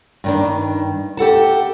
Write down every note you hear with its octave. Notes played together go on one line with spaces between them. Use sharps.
G2 D#3 D4
G4 A4 F#5 A5